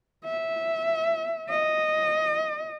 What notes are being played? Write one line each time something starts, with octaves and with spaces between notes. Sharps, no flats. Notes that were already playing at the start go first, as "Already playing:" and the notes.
E5
D#5